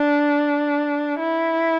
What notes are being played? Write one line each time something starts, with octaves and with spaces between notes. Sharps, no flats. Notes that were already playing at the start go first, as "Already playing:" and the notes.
Already playing: D4
E4